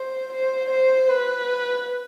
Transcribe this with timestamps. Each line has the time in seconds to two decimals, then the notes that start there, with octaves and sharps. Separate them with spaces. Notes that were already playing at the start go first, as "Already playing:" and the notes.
Already playing: C5
0.32 C5
0.70 C5
1.09 B4